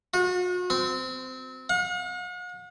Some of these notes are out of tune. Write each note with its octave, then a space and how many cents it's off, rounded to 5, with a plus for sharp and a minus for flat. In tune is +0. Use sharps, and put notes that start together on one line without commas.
F#4 -40
C4 -20
F#5 -45